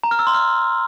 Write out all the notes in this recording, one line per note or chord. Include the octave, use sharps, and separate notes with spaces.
A#5
F6
E6
C6
F6